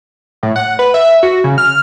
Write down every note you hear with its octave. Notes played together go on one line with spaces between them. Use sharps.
A2
F#5
B4
E5
F#4
C#3
F6